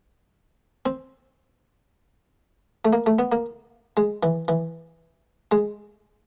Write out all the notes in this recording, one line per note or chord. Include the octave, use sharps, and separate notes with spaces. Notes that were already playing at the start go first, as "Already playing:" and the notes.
C4
A3
A#3
A3
B3
A#3
G#3
E3
E3
G#3